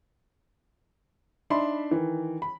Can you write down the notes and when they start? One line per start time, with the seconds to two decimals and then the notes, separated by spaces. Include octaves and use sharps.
1.50 D4 D#4 E5 B5 C6
1.91 D#3 E3
2.42 B5